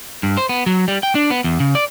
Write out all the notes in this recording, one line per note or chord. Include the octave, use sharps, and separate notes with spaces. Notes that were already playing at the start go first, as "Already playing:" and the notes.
G2
C5
B3
F#3
G3
G5
D4
B3
E2
C#3
D5